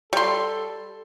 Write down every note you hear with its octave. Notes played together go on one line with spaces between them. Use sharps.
G3 A4 C6